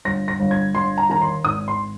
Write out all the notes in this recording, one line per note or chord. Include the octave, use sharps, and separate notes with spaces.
G1 A#6
A#6
G1
G#6
G1 C6
A#5
D#3 A#5
C6
G#1 D#6
C6